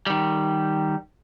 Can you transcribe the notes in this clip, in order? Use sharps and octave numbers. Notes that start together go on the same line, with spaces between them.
D#3 G3